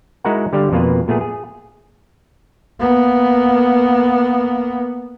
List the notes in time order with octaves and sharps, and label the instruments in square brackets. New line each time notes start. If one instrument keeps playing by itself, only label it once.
[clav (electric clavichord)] G#3 D#4 E4 F#4 A#4 F#5
D3 G3 G4 D5 F5
F2 B2 A#3 F4 B4
A#2 A3 B3 G#4
G#4
[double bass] A#3 B3